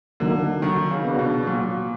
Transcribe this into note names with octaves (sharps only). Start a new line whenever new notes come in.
D3 D#3 F#3 A#3
D#3 F#3
C#3
B3 D4 F#4
B2
A#2 F#3